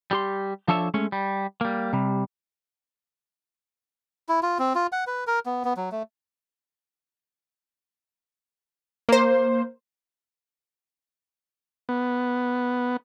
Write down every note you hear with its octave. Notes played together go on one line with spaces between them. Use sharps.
G3 G4 C6
F3 D4 A4 C#5 E5
G#3 A3 C#4 C#5
G3
G3 A#3
C3 G3
E4
F4
C4
F4
F#5
B4
A#4
B3
B3
F#3
A3
A#3 C5
B3